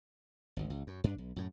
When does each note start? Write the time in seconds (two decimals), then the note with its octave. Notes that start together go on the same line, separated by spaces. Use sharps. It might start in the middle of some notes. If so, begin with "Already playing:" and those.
0.57 G#1 D2
0.70 C#2
0.87 F#2
1.04 G2 D4
1.18 B1
1.36 F#2 A2